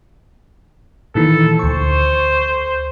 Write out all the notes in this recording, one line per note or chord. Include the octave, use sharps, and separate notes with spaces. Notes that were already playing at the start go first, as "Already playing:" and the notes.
A#2 D#3 E3 A4
D2 C5 C#6